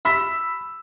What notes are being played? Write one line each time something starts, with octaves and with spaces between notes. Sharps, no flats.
B5 E6 B6